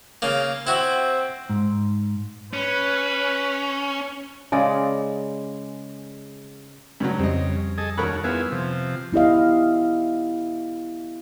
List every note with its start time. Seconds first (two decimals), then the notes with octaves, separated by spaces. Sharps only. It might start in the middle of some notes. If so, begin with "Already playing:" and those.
0.22 C#3 A#3
0.67 C4 E4 F#4
1.50 G#2
2.53 C#4 B4
4.52 C#3 G#3 D5
7.00 G2 C#3 F#3
7.19 F2 G3 C4 D#5
7.78 G#4 A4 D#5
7.98 D#2 C#4 F#4 A#4 B5
8.24 B3 E4 F4 G#4
8.51 C3 F3
9.13 B3 E4 G4 D#5 F5